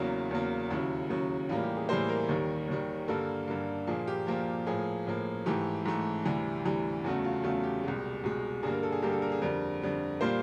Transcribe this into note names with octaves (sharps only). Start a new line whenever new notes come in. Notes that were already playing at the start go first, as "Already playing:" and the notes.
Already playing: E2 C#3 F#3 A#3 E4
E2 C#3 F#3 A#3
D#2 C#3 F#3 E4
D#2 C#3 F#3
A2 E3 G3 A#3 F4
G4
G#4
A2 E3 G3 A#3 C5
A#4
D#2 D#3 G3
D#2 D#3 G3
G2 D3 G3 A#3 A4
G2 D3 G3 A#3
A#2 F3 A#3 G#4
G4
A#2 F3 A#3
A2 F3 A#3 G#4
A2 F3 A#3
G#2 E3 A3 G4
G#2 E3 A3
D2 C3 E3 G3
D2 C3 E3 G3
E2 C#3 F#3 A3 F#4
F4
E2 C#3 F#3 A3 F4
G4
C2 B2 G#3
C2 B2 G#3
G2 D3 G3 A#3 G#4
A#4
A4
G#4
G2 D3 G3 A#3 G4
A4
A#4
G#4
F2 D3 G3 A#4
F2 D3 G3
A#2 G3 A#3 C5